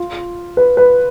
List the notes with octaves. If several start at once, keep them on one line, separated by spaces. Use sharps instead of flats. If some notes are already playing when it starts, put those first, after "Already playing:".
Already playing: F4
B4
B4